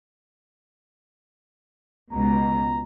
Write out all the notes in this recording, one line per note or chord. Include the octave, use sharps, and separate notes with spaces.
C#2 B2 A#5